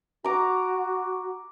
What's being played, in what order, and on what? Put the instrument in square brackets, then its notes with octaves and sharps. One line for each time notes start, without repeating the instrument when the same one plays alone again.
[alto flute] F#4 [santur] A#5 D6